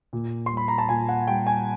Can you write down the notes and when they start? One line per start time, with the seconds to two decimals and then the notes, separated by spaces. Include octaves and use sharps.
0.13 A#2
0.46 G3 C6
0.57 B5
0.68 A#5
0.78 A5
0.89 A#2 G#5
1.09 F#5
1.28 G3 G5
1.47 G#5